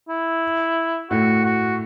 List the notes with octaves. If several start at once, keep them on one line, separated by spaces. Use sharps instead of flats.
E4
A2 A3 F#4
F#4